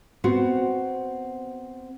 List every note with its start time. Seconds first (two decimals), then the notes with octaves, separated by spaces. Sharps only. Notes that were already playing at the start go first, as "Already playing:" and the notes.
0.24 B3 C4 F#4 C5